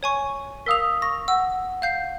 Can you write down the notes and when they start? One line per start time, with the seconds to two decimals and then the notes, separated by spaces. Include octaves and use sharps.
0.03 C#5 G#5 C#6
0.66 A#4 F5 D#6 E6 B6 F7
1.02 C#6 A#6
1.28 F#5 E6
1.82 F5 G6 C7